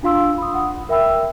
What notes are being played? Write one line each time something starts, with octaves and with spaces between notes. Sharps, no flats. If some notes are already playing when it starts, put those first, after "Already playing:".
D4 F4 F5 C6 E6
B5 D#6
F#5
A#4 E5 G5 B5 E6